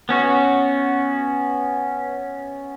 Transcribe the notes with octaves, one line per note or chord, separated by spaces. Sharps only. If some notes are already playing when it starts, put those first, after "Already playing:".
B3 C#4 F#4